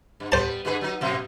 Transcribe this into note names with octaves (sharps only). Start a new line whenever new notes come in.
G2
G3 B3 C5 A5
G2 G#4 B4
F#3 D#4
F#2 B2 A#3